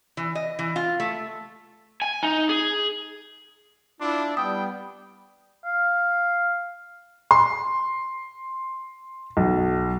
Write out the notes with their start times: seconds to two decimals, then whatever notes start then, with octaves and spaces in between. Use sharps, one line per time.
0.17 E3
0.35 D#5
0.59 E3
0.76 F4
1.00 A3
2.02 G#5
2.23 D#4
2.49 G#4
4.01 D4 E4 F4 C6 D6
4.37 G3 B3 G5 D#6
5.65 F5
7.31 C6
9.37 B1